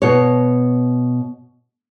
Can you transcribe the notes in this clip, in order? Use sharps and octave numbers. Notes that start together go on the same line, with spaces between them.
B2 C#5